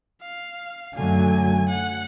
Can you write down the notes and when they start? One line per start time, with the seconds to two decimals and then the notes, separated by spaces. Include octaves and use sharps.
0.22 F5
0.96 F#2 D3 F#3 A3 G#5
1.69 F#5